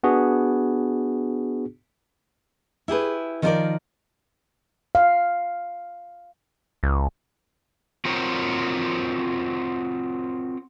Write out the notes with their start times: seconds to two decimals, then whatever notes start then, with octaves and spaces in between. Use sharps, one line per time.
0.03 B3 D4 F#4 G#4
2.88 E4 G4 G#4 B4
3.42 D#3 F3 F4 G#4 A#4 D5
4.95 F5
6.83 C#2
8.05 C4 F4 F#4 A#4 C5 C#5